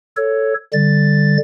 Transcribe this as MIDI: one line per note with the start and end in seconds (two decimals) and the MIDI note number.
0.17 0.54 69
0.17 0.54 73
0.73 1.38 50
0.73 1.38 55
0.73 1.38 93